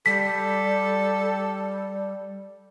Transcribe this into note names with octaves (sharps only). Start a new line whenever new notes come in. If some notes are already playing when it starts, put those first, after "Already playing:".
G3 A4 B6